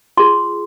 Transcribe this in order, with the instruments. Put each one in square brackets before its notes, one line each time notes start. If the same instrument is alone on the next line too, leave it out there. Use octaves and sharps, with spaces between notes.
[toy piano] F4 G#4 C6